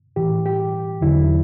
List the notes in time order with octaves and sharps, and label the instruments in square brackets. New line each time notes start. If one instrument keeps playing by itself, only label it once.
[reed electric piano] A2 E3 G4
G4
E2 D3 F#3 E4